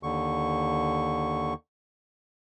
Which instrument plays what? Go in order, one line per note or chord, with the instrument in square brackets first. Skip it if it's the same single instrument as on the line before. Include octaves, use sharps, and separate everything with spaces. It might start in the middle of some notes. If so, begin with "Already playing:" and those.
[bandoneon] D#2 D3 C#6